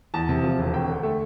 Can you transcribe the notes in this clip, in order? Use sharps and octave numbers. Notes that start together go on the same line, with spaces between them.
E2 A5
C3
F3
E1
D2 G5
D3
A3